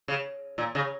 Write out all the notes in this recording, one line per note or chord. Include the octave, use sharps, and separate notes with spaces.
C#3
A#2
C#3